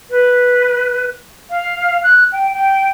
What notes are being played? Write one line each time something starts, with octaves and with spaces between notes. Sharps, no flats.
B4
F5
F#6
G5
G5